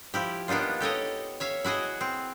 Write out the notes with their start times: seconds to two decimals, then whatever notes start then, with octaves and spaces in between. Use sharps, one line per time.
0.14 F3 E4 G4
0.48 A#3 B3 D4 D#4 F4
0.80 G4 A4 C#5 D#5
1.40 C#5 E5 F5
1.65 E4 F#4 G#4 D#5
2.01 C4